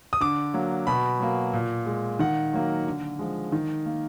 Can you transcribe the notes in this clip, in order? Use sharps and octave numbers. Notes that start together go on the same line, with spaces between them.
D#6
D3 D6
F#3 A#3
B2 B5
F#3 A#3
A#2
G#3
D#3 F#5
F#3 A#3
D3
F3 G#3
D#3
A#3